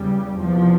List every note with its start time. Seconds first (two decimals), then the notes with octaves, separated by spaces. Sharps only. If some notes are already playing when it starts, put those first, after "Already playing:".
Already playing: E2 C#3 G3
0.37 E2 C3 F3